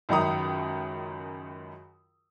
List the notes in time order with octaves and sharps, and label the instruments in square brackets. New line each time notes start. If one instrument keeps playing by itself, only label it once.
[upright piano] C#2 F#2 D#3 A#5 D#6